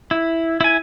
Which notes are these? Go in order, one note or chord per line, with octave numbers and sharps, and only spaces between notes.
E4
E4 G#5